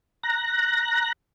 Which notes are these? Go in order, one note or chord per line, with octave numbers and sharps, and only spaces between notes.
A#5 F#6 A#6